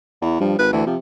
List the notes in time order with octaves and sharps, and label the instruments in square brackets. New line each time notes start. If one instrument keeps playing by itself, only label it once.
[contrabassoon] E2
[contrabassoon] G2 [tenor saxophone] F3
[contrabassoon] G#1 [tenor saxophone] B4
[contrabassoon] D2 [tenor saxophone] E3
[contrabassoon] C3 [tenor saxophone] F3